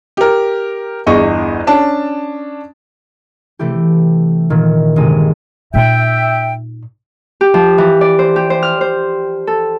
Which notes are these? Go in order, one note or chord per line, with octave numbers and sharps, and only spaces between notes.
G4 A#4
G1 E2 G#4 D#5 C#6
C#4 D4 A5
C3 E3 A3 E4 G4
A#2 D#3
G1 C3 G#3 D#7
A#2 D#4 E5 G5
G4
F3
E3
D5
C5
G4
C5
F6
C5
A4